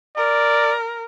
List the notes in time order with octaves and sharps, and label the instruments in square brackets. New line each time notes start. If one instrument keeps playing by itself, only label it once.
[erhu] A#4 [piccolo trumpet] D5